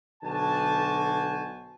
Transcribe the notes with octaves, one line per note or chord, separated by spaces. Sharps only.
B1 D3 F#4 C5 G#5 A5